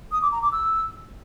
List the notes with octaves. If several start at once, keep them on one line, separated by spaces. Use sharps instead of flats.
D#6
D6
A#5
D6
E6